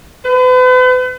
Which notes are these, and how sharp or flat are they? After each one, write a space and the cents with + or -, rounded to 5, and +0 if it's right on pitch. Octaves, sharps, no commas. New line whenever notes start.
B4 +40